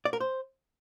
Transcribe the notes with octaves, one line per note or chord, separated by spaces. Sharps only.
D5
A#4
C5